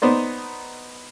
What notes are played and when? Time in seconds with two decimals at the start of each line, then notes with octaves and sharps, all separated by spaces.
0.02 B3 D#4 C5 D5